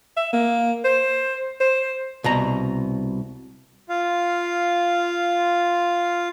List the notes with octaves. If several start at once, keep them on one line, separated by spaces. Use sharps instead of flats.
E5
A#3
C5
C5
C2 B2 A#5
F4 F5